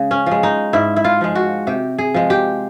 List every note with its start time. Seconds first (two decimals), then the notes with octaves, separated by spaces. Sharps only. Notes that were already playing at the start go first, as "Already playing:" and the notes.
Already playing: C#3 G#3
0.11 C#4
0.26 F3 G#3
0.43 D#4
0.73 G#2 E4
0.96 E4
1.04 F4
1.21 F3 G#3
1.35 F#4
1.67 C3 G4
1.98 G#4
2.14 F3 G#3
2.30 G4